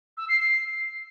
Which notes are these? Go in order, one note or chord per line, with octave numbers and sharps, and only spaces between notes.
E6
C7
C7